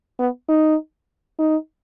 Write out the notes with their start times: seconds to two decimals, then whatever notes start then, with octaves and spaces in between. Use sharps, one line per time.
0.19 B3
0.49 D#4
1.39 D#4